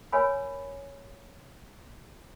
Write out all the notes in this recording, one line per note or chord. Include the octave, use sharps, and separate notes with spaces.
A#4 C#5 G#5 B5